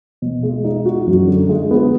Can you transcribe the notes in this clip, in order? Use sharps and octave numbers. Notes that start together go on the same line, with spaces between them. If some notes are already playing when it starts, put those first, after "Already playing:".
B2
G#3
D#4
F#4
F#2
D3
G#3
B3